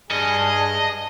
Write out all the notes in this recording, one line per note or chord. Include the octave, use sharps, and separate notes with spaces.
G2 G#4 D#5 A5